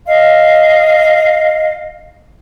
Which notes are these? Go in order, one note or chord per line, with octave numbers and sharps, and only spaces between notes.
D#5 F5